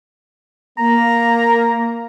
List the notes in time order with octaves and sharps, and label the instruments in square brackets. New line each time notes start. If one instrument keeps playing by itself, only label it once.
[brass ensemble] A#3 [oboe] A#5